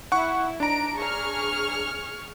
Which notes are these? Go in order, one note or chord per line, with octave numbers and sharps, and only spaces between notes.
E4 F#5 C#6
D4 D#4 A#5 D7
G#4 C#6 F6